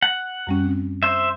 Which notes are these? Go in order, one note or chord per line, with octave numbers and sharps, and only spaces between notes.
F#5
F#2 G3 C#4
C4
C5 E5